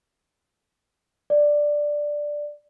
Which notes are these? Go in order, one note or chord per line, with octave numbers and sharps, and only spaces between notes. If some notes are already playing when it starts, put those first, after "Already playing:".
D5